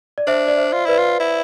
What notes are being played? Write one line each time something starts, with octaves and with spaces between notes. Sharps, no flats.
D5
D4 C5 E5
D5
C5 E5
F4
E4 B4 D5
F4
E4